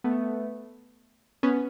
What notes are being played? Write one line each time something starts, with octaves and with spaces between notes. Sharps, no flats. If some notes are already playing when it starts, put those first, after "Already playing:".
A3 B3
B3 C#4